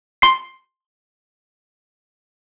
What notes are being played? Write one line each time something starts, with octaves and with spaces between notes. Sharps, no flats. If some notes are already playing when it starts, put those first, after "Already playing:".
C6 C7